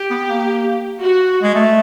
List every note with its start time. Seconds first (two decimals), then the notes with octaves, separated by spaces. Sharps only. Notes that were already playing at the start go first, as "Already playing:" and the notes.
Already playing: G4
0.10 B3
0.28 A#3
1.00 F#4
1.43 G#3
1.55 A3